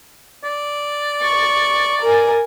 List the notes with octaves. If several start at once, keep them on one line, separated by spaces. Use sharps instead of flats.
D5
C#6
A#4 G#5